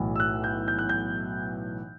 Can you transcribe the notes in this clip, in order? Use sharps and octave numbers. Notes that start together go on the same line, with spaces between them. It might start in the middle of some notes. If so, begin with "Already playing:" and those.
Already playing: B1 A2 E3
E6
F#6
G6
G6
F#6
G6